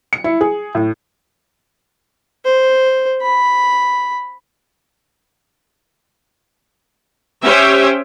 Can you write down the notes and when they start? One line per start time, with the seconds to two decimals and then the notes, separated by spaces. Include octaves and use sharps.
0.13 C#7
0.24 E4
0.41 G#4
0.75 A2
2.45 C5
3.22 B5
7.43 C#4 G4 C5 C#5 E5 G5